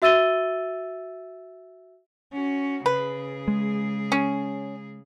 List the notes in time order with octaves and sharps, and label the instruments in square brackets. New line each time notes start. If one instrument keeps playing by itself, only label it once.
[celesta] F#4 E5 E6 A6 D#7 G7
[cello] C#4 F#4
[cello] C#3 G#4 [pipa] B4
[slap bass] G#3
[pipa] C#4